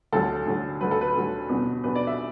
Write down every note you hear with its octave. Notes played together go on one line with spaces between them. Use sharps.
D2 D3 F#3 A4
D2 D3 F#3
D2 D3 F#3 B4
A4
B4
D2 D3 F#3
E2 B2 F#3 D4
E2 B2 F#3 D4 B4
D5
E5